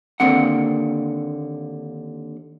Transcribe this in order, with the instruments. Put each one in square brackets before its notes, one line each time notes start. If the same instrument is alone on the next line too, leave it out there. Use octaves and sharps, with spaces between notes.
[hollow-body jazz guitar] D#2 D3 A#3 C4 F#5